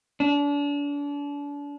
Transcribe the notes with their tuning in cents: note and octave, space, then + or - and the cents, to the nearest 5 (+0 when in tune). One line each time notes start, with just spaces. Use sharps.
D4 -35